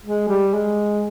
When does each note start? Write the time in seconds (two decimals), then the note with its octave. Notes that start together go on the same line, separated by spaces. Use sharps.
0.04 G#3
0.28 G3
0.54 G#3